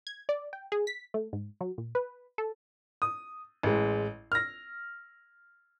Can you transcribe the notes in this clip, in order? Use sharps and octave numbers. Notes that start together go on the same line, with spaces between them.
G#6
D5
G5
G#4
B6
A3
G#2
F#3
A#2
B4
A4
D#6
A1 G#3
F6 A#6